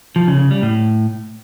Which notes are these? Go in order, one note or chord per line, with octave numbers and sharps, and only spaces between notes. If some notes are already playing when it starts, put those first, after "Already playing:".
F3
C#3
C#3
G3
A2